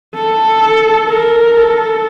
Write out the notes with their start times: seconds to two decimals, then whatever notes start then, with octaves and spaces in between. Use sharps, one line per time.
0.15 A4
1.08 A#4
1.56 A4